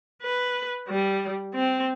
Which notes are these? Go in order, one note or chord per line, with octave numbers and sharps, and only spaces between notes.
B4
G3
C4